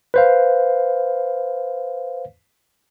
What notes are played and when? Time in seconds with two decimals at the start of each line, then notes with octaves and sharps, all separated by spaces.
0.14 B4 C5 F5